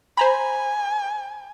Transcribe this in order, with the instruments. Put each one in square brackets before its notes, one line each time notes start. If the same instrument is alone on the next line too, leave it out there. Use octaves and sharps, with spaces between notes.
[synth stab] C5 A#5 B5 [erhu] G#5